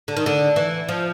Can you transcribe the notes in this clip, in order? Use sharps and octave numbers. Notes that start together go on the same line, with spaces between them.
D3
D#3
D3
E3
F3